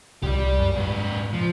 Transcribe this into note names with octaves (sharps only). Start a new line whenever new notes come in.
C2 G4 D5
F#2
G#2 B4
F3